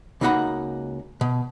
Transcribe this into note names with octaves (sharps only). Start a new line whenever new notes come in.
C#2 A#3 D#4 F#4 F#5 B5
B2